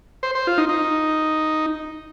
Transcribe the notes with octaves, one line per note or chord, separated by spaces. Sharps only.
C5
C5
F4
D#4
D#4